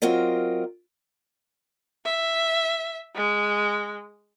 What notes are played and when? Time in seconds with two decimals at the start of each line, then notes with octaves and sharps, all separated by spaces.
0.02 F#3 C4 F4 A#4 D#5
2.05 E5
3.15 G#3